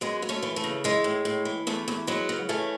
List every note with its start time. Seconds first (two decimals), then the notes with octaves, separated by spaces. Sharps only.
0.01 F#2 G#3 B3
0.22 F#2
0.29 A3 C#4
0.42 E3
0.56 A3
0.64 C#3
0.84 E3 G#3
1.04 A2
1.25 A2
1.45 E3
1.67 E2 A3
1.88 E2
2.07 F#3 G#3 B3
2.29 C#3
2.49 E3 A3 C#4